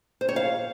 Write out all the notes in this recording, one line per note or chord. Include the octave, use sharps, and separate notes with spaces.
C5
C#5
F5